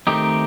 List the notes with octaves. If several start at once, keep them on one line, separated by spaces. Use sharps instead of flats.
D#3 A3 C4 D#4 G4